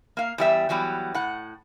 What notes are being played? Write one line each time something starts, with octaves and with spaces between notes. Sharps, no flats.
A#3 F5
E2 G3 E5
E3 F#3 G3 B3
A2 F#5